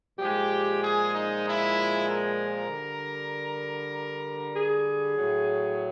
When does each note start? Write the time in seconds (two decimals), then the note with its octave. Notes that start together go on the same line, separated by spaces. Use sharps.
0.19 A#2 F3 G#3 G4
0.81 G#4
1.13 D#4
1.44 E4
2.06 A#4
2.69 D3 G3
4.55 G#4
5.17 A2 F#3